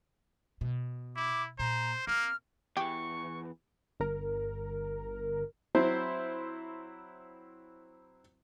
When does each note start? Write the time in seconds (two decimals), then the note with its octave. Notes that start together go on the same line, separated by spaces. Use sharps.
0.61 B2
1.16 E4 D6
1.59 A#2 C5 A#5
2.07 A#3 C4 F6
2.77 E2 E3 G4 C#6
4.00 G1 A#4
5.75 F#3 C4 E4 C5